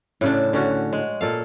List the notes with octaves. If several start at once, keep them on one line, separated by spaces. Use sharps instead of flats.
A2 C#3 D4
D3 C#4 F#4
G#3
A#2 A4 F5